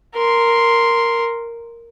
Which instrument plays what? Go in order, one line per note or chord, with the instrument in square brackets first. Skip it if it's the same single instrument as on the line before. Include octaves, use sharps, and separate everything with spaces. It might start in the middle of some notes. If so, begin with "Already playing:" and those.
[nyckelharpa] A#4 C6